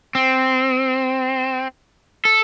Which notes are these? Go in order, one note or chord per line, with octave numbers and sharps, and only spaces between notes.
C4
A4